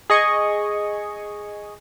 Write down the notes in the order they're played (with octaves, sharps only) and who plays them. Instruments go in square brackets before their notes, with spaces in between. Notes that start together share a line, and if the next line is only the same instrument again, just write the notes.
[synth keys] G#4 D#5 C#6